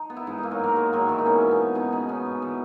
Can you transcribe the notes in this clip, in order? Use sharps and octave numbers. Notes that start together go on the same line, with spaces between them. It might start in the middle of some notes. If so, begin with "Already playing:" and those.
Already playing: D#4
B3
E4
G#2 D#4
A#3 D#4
F#3 F#4
G#2 A#3 A#4
G#2 G#3 G#4
D#3 F#3 F#4
G#2 E3 E4
D#4
B2 C#4
B3
C#4
B2
B2 D#4
B2 D#4
B3 C#4
G#2
E3